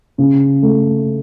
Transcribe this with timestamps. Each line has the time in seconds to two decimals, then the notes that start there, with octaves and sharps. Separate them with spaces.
0.18 C#3
0.63 A3